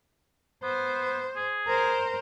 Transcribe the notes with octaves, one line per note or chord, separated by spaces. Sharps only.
B3 C5
G#4
A#4 C5